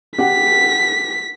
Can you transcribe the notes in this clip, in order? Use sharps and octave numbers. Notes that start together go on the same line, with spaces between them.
G4 F#5 B6